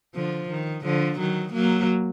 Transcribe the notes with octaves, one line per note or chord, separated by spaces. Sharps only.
D3 F3
D#3
D3 F3
D#3 F#3
F#3 A#3